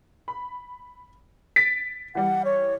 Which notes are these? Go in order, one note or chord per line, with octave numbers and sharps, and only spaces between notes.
B5
A6 B6 D7
E3 G3 F#5
C#5